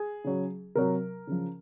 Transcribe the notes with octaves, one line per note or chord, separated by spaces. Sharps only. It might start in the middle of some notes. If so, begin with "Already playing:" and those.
Already playing: G#4
C#3 F#3
C3 F#3 A#4
C#3 F3